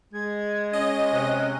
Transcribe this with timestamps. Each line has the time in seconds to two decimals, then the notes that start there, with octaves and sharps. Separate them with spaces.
0.14 G#3 G#6
0.73 C#4 D#5
1.13 C3 F#6